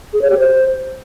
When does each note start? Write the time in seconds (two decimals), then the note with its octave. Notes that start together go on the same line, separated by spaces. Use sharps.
0.13 G#4
0.22 C#5
0.30 G4
0.38 C5